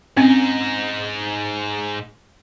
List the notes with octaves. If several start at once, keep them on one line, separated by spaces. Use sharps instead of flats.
G#2 C4 C#4 D#4